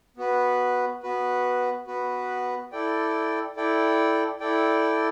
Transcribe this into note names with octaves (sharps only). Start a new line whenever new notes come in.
B3 F#4 B4
B3 F#4 B4
B3 F#4 B4
E4 A4 D5 G5
E4 A4 D5 G5
E4 A4 D5 G5